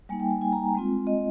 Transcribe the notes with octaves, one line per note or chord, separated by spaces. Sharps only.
G3 A#3 D#4 G#5
G5
G#5
G#5
A#5
G#3 C4 F4
D#5